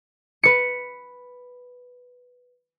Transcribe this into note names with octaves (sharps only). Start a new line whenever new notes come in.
B4 C#7